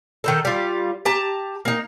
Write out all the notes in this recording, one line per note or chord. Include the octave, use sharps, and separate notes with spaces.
D#3 D#4 A4
G3 F4
G4 A5 A#5
A#3 D#4